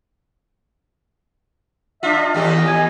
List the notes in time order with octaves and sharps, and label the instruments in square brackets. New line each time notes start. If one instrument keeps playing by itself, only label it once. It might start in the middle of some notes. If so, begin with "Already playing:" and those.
[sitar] D4 F4 [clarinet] E5
[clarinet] D#5
[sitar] D#2 A2 G4
[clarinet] G#5